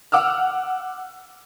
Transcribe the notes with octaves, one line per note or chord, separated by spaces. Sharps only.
F#5 D6 E6 F6